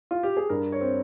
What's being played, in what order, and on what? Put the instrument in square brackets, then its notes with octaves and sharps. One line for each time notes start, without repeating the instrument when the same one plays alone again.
[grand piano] F4
G4
G#4
G2 A#4
C#5
C4